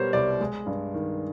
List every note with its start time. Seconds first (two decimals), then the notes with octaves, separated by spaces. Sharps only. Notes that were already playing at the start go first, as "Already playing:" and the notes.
Already playing: B2 G3 B3 A#4 C5 C#5
0.13 C2 D5
0.40 G#3
0.66 G2
0.94 D#3